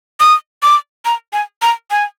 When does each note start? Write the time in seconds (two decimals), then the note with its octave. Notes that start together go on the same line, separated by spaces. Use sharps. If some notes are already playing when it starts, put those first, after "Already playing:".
0.20 D#6
0.63 D6
1.05 A#5
1.33 G#5
1.62 A#5
1.91 G#5